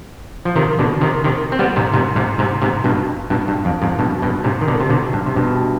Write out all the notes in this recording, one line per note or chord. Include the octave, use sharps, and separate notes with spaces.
F3
C3 D#3
B2 D3
C3 D#3
C3 D#3
C4
G3 B3
G#2 C3
G#2 C3
G#2 C3
G#2 C3
G#2 C3
G2 B2
G2 B2
G2
F2
F2 G#2
G2 B2
G2 B2
G#2 C3
D#3
B2 D3
C3
B2 D3
G2
C3
G2 B2